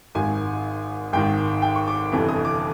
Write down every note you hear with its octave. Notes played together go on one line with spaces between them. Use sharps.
G#1 G#2 D#3 G#5
G#1 G#2 D#3 G5
G5
C#6
D6
G1 F2 C3 E3
D#6
D6